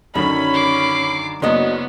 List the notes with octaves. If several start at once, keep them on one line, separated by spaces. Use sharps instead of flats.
F#2 D3 D#3 C#4 B5
D6 C7
F#1 F#3 B3 D4 D5 D#5